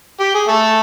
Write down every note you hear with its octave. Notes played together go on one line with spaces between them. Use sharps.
G4
G#4
A3 A4